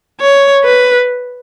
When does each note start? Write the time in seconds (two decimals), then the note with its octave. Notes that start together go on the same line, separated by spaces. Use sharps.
0.21 C#5
0.64 B4